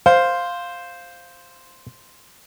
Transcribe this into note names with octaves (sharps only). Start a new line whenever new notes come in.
C5 F5